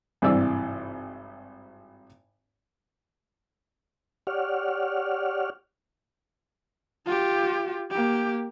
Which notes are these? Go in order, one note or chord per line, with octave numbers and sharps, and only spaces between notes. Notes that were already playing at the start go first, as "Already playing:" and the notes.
G#1 G2 C3 E3 D5 E6
G4 C#5 D5 F#5 F6
F4 G4
A#3 G4